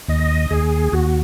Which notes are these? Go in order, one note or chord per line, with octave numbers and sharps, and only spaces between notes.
D#2 D#5
D#2 G#4
D#2 F#4